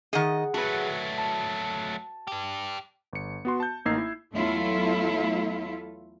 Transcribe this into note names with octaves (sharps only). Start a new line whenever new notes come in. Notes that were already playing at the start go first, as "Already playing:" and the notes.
D#3 G#4 D#5 F#5
F#3 A3 F#4 B4
A5
D4 G4
G1 C#7
B3 F#4 C6
A5 G6
A1 A#3 D#4 E6 G#6 C7
E4
E2 F#3 A3 E4 F4 A4